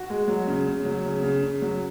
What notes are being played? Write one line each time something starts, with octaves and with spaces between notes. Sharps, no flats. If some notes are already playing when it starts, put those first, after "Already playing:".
Already playing: F#4
G#3
F#3
C#3
C#3
F#3
C#3
C#3
C#3
F#3